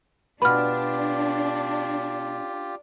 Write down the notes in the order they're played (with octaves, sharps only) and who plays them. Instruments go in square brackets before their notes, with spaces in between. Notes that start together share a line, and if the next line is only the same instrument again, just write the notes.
[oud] B2 B4 [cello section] D4 [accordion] F4 G4 [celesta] B5 F6